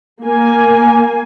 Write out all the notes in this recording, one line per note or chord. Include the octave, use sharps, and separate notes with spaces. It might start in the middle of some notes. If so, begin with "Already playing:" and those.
A#3 G#5